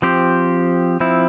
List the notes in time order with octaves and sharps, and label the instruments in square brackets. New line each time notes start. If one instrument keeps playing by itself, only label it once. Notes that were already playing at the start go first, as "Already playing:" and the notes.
[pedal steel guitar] F3 C4 G4 C5
F3 C4 E4